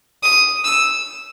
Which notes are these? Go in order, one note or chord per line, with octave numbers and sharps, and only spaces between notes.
D#6
E6